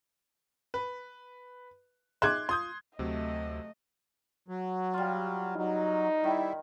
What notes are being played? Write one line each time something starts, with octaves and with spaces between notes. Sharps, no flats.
B4
D#4 G#4 E5 C6 D6 F#6 G#6
F4 C6 D#6 G6
D2 C3 F#3 A3 D#5
F#3
G3 F4
F#3 D#4
D#3 G3 E4